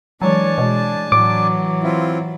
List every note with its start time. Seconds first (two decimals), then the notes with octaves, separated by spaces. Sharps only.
0.22 E3 F#3 G#3 D4 C#5 G#5 A5
0.58 B2 G#3
1.12 A2 E3 F#3 D6
1.83 C4 E4 F4